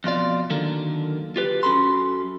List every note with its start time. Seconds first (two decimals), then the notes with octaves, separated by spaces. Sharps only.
0.04 F2 B2 F4 D5
0.50 D3 D#3 F#3 A#3 A4 A#4
1.36 F4 G4 B4
1.63 F#2 C#4 F#4 A4 B5 C6